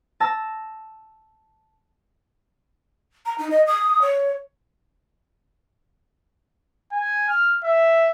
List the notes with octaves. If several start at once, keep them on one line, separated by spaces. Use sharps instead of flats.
A5 E6 A#6
A#5
D#4
D#5
D#6
C#5
G#5
F6
E5